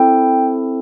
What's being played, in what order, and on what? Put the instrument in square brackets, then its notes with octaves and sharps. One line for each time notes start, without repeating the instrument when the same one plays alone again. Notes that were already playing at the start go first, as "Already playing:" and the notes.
Already playing: [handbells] C4 E4 A4 G5